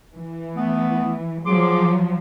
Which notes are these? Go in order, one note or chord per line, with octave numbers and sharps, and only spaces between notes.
E3
A3 B3
F3 F#3 G#4 C6 D6